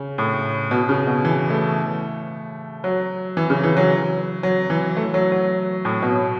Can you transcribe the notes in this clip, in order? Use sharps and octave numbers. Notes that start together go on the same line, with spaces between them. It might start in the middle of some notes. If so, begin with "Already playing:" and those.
Already playing: C#3
A2
B2
C#3
B2
E3
A3
F#3
E3
C#3
E3
F#3
F#3
E3
A3
F#3
F#3
A2
B2